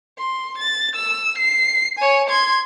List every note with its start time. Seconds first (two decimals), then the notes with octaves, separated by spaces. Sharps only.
0.18 C6
0.58 A6
0.95 E6
1.38 C7
1.99 C#5 G#5
2.29 C6 G#6